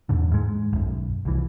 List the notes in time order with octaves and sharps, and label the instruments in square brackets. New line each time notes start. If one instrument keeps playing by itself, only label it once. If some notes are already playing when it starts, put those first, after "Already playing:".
[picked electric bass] E2 G#2 D3
G#2 G#3
B1 F#2
C2 E3